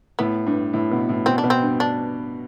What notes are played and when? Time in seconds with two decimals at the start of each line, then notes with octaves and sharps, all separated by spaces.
0.19 A2 B3
0.46 G2
0.73 A2
0.91 B2
1.09 A2
1.26 B2 C4
1.38 D4
1.44 B2
1.50 C4
1.62 G2
1.80 D4